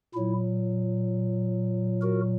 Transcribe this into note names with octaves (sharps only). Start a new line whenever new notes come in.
A#2 F#3 E4
F#4 A#4